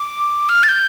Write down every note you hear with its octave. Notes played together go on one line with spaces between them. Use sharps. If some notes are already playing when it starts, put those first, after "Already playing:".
Already playing: D6
F6
A6
G6